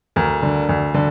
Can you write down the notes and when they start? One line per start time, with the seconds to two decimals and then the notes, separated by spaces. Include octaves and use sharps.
0.16 D2 A#4
0.43 D3
0.69 D2
0.94 D3